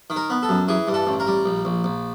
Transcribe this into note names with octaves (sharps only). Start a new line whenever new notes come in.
D#3
A#4
B3
A4
F#2
E3 G#4
G2
A4
A1
A#4
G3
A#1
A#1
A#1